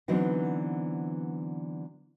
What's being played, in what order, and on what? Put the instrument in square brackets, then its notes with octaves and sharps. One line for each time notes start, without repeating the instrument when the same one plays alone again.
[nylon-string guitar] D3 E3 F#3 B3 C4 D#4